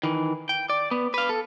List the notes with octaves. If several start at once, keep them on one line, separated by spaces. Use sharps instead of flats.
D#3 E3
G5
D5
B3
B4 F5
A4